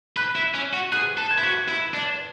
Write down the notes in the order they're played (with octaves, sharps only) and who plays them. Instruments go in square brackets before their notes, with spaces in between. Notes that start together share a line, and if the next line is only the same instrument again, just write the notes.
[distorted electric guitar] B4 [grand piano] F#6
[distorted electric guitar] E4
C#4
F#4
[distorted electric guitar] G#4 [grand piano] F#6
[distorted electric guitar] A4
[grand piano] G#6
[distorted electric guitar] E4
F#4
E4
D4